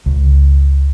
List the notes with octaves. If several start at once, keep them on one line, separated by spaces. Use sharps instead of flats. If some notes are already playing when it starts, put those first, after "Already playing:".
C#2